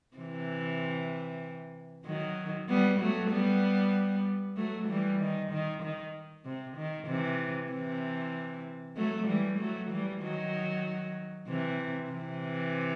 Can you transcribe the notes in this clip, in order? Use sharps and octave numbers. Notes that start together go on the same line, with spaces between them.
C3 E3
D#3 F#3
G3 B3
F#3 A3
G3 B3
F#3 A3
E3 G3
D#3
D#3
D#3
C3
D#3
C3 E3
C3 E3
F#3 A3
E3 G3
F#3 A3
E3 G3
D#3 F#3
C3 E3
C3 E3